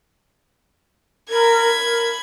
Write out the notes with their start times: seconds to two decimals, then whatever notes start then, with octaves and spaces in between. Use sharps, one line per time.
1.29 A#4 B5 G#6
1.79 A#4